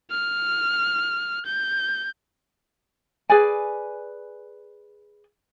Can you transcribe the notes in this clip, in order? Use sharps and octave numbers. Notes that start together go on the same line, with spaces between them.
F6
G6
G#4 B4 D5 G#5